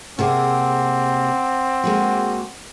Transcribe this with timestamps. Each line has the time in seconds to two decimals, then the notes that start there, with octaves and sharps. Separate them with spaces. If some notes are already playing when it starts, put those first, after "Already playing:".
0.19 C3 A#3 C4 G#4 F#5 D6
1.84 G#3 A#3 F#4